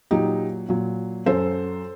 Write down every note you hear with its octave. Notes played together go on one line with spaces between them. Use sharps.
A#2 F#3 D#4 G4
A#2 F#3
F#2 F#3 A4 C5